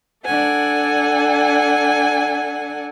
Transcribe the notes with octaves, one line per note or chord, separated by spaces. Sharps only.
D4 A4 F#5 G#5